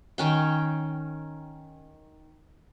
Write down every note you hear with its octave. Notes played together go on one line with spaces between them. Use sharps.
D#3 C#4 G5